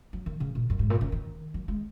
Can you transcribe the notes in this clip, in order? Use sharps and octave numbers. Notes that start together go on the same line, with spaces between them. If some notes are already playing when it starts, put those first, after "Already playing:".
F#3
D#3
C#3
A#2
F#2
G#2
A#2
C#3
D#3
F#3
G#3